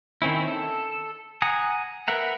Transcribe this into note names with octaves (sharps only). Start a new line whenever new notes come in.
D#3 C4 C#4 E4
A4
F#5 G#5 A#5 D#6
A#4 B4 E5 F#5 A#5